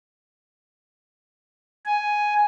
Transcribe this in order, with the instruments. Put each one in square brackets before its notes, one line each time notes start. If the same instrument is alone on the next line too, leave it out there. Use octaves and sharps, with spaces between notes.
[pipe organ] G#5